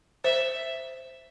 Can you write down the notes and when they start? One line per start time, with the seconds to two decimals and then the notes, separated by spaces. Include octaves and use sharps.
0.24 C5 E5